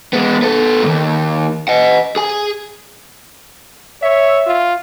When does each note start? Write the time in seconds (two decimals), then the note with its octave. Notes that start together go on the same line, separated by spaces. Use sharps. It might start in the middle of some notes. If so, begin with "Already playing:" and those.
0.13 G#3 B3
0.42 B3 A4
0.83 D#2 G#2
1.68 D#5 F#5
2.16 G#4 G#5
4.02 C#5 E5
4.47 F4